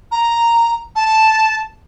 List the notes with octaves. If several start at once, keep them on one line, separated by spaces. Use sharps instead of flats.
A#5
A5